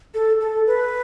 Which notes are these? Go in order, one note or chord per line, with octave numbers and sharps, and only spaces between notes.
A4
A4
B4